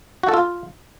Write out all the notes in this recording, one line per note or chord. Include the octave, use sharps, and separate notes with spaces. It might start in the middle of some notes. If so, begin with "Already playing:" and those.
F#4
A4
F4